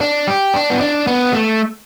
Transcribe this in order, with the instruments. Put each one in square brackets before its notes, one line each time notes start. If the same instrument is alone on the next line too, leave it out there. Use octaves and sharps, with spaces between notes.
[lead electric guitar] D4
G4
D4
B3
D4
B3
A3